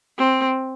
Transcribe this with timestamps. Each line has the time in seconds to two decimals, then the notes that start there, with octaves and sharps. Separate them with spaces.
0.18 C4